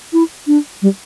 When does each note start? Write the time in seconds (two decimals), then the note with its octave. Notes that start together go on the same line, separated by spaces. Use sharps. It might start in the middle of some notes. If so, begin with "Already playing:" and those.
0.13 E4
0.47 D4
0.82 G3